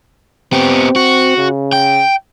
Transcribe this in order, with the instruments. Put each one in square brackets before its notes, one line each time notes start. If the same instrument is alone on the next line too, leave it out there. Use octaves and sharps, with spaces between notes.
[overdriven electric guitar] B3 G4 [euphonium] C4
[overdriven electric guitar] F#4
[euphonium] C#3
[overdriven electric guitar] G5